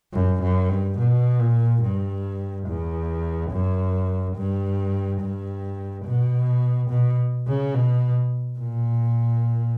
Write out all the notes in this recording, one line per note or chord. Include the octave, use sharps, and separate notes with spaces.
F#2
F#2
G2
B2
A#2
G2
E2
F#2
G2
G2
B2
B2
C#3
B2
A#2